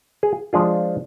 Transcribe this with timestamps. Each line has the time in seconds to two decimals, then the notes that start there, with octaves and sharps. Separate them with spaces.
0.23 G#4
0.53 F3 G#3 D4 F4 G#4